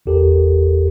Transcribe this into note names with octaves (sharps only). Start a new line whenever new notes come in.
G1 E2 G4 A4 A#4